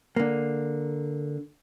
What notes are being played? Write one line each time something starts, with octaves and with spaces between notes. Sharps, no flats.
D3 A#3